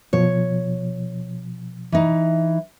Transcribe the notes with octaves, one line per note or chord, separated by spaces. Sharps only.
B2 F3 C#5
E3 D#4